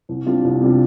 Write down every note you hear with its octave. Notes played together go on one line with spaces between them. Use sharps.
C2
C3 G3 D4 F4
C2
C3 G3 D4 F4